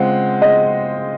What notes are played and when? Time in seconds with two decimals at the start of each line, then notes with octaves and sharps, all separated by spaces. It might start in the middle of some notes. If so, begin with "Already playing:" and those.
Already playing: C#3 G#3 C4 F4 C5 F#5
0.42 D#5